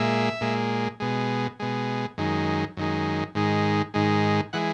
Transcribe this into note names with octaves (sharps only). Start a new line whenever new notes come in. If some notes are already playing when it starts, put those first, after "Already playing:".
Already playing: A#2 G#3 E5
A#2 G#3
B2 G#3
B2 G#3
F#2 D#3 G#3
F#2 D#3 G#3
G#2 D#3 G#3
G#2 D#3 G#3
E3 G#3 F#5